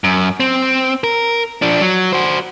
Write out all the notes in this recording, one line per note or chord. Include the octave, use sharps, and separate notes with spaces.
F#2
C4
A#4
F3 D4
F#3
F#4 C5